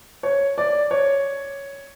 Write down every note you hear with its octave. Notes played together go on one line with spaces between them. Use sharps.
C#5
D5
C#5